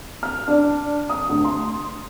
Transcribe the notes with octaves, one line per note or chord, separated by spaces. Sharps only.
F6
D4
D#6
D2
C6